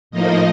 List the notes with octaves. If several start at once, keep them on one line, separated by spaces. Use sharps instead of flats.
A2 F3 A#3 D#4 D#5